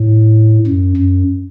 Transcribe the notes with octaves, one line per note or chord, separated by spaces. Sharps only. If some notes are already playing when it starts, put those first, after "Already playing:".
Already playing: A2
F#2
F#2